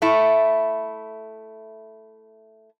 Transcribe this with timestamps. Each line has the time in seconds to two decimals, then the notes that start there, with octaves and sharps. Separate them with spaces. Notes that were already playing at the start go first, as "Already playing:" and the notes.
0.02 A3 E4